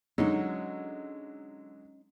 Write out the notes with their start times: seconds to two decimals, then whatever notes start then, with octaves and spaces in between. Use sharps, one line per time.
0.18 D3 F#3 G#3 C#4 D#4 F#4